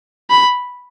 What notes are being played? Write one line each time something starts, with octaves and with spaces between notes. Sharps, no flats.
B5